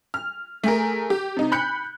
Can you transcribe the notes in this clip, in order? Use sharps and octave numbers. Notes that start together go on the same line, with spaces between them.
F6
A3 G#4 A#4
G4
C3 D#4
B5 F#6 G6 C#7